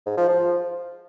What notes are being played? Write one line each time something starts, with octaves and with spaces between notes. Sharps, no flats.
G#2
F3
F3